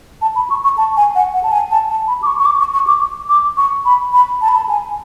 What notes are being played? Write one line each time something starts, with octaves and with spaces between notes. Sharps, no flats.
A5
B5
C#6
C#6
A5
G#5
F#5
F#5
A5
G#5
A5
A5
B5
D6
C#6
C#6
D6
C#6
C#6
D6
D6
C#6
B5
B5
A5
B5
A5
G#5